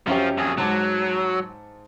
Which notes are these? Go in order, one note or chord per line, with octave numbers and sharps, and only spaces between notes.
F#2 F3 C#4 G4
F2 G#4
G#2 F#3 A5 D6